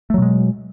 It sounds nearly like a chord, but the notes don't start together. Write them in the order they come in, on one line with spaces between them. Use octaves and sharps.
A3 F#3 B2 G#3